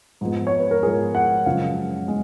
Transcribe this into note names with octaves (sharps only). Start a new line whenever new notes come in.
G#2 F3 G#3 B3
C#5
B4
A#4
G#2 F3 G#3 B3 G#4
F#5
F#2 C#3 F3 G#3 F5
G#3